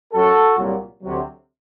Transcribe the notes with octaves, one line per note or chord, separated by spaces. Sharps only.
F#2 F#3 F#4 A4
C2 A#2 F#3
D2 C3 F#3